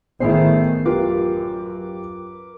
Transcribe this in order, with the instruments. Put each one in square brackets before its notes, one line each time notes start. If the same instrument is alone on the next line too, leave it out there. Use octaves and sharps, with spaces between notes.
[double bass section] A1 D#3 A3 [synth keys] B3 C7 [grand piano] E4 G#4 C5
[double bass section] F#2 [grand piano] F4 G4 [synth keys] A#4 B4 D6